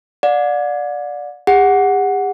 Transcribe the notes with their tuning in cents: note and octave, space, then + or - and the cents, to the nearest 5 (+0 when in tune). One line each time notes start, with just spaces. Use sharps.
D5 +0 F#5 -45
G4 +45 F#5 +0